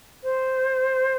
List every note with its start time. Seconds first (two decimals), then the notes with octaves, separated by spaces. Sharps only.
0.23 C5